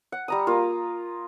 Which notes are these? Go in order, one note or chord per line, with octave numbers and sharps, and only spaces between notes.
F#5
G3 A#5 D#6
A#3 F4